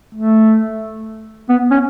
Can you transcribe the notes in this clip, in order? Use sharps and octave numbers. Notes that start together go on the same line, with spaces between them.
A3
B3
C#4